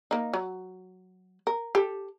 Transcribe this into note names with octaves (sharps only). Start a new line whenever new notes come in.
A#3 D#4
F#3
A#4
G4 A4